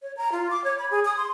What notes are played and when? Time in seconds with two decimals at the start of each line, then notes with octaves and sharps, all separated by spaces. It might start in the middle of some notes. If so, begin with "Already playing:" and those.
0.02 C#5
0.17 A#5
0.32 F4
0.50 D6
0.64 C#5
0.79 B5
0.91 G#4
1.05 D#6
1.17 C6